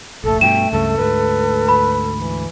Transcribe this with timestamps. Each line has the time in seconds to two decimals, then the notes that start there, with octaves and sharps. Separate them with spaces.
0.24 F1 A#1 A3 A4
0.41 G2 B2 G5 E7
0.72 C#2 G2 C#3 A4
0.98 D2 G#2 A3 B4
1.69 B5
2.14 E3